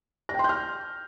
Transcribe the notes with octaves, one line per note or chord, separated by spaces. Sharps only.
A#6
G5
C6
G6
F6